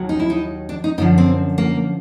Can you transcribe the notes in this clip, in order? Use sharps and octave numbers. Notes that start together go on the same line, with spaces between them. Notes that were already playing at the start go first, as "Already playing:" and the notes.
Already playing: D#2 D#3 F#3
D#4
E4
D#4
D4
D#4
F#2 D3 F3 D#4
C4
A#3